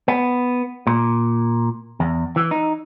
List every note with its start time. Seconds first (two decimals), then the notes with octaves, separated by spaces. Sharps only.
0.08 B3
0.87 A#2
2.00 E2
2.36 E3
2.51 D#4